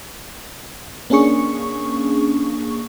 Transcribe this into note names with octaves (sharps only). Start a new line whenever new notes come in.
A#3 C#4 D4 G#4 C#6